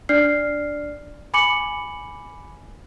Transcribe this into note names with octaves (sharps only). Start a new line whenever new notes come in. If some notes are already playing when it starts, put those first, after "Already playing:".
D4 D5 F6 C7
G#5 B5 D6 C#7 F#7